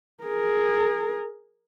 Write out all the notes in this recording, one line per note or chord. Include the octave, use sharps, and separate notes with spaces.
G#4 A#4